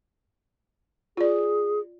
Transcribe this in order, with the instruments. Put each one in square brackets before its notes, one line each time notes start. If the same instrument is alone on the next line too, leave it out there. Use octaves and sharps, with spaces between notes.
[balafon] F4 D5 [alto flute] G#4